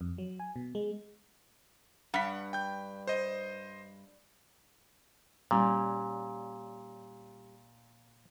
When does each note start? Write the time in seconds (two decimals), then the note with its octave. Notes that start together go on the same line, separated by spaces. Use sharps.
0.01 F2
0.18 F#3
0.40 G#5
0.56 B2
0.75 G#3
2.14 G2 F#5 B6
2.53 G5 G6
3.07 C5 D#5
5.51 A#2 G3 C#4